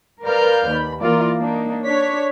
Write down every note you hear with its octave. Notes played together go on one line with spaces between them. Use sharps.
A#4 B4 D5 F5 F6 G6
D#2 B5
E3 A#3 F4 A#4 D5
A#3 D4 D#4
D4 C#5 B6